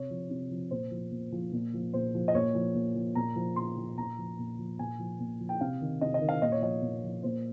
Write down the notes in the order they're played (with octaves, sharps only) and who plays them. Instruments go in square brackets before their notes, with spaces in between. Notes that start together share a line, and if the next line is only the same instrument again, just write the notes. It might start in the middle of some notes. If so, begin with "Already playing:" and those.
Already playing: [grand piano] C3 C#5
F3
C3
F3
A#2 C5
F3
A#2
F3
A#2
F3
A#2 C5
F3
D#5
A#2 C#5
F3
A#2
F3
A#2 A#5
F3
A#2 C6
F3
A#2 A#5
F3
A#2
F3
A#2 G#5
F3
A#2
F3
G5
C3 F5
D#3
C3 D#5
D#5
D#3
F5
A#2 D#5
C#5
F3 D#5
A#2
F3
A#2 C5